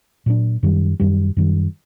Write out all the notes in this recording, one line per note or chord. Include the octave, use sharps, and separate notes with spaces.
A#2 F#3 A#3 D4
F#2 D#3 G3
F#2 D#3 G3
F#2 D#3 G3